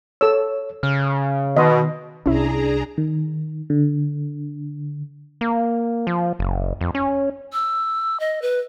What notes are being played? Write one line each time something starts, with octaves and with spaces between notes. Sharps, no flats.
A4 C#5 E6
C#3 F6
B2 D#3 D#5 C6
C2 C#4 D4 E4 G#4 A#5
D#3
D3
A#3
F3
F#1
F2
C#4
E6
D#5
B4